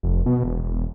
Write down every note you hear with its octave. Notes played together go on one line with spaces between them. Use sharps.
F1
B2
E1
E1